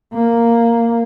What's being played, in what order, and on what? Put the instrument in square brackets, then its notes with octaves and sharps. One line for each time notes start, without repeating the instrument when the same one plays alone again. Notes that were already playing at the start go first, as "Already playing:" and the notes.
[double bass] A#3